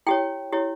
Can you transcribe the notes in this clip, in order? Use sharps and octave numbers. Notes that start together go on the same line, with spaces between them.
E4 G4 C#5 G5
E4 G4 C#5